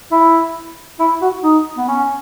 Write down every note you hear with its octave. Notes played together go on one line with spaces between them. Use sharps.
E4
E4
F#4
D#4
B3
C#4